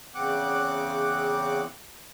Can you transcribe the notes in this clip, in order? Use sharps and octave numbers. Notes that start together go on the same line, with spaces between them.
E2 C#3 C4 F#5 D6 F#6